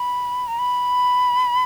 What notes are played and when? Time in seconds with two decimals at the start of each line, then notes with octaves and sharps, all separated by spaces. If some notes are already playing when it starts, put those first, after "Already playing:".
Already playing: B5
0.48 A#5
0.59 B5